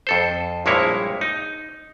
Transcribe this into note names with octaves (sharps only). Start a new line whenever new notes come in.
F2 A4 C5
A#1 G2 G#3 A#3 E4 C#5
D#4